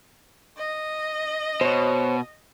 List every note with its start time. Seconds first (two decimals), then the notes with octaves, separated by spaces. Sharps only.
0.58 D#5
1.61 B2 C5 C#5